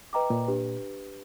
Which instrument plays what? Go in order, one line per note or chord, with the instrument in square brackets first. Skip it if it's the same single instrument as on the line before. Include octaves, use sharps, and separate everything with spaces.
[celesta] B4 D#5 G5 A#5 D6
[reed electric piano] A#2
[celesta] D4 G4 B4